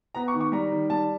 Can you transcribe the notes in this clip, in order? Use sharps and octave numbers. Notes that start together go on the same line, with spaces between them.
B3 A#5
C#6
D#3
C#6
G3 A#5
D#3
G3 A5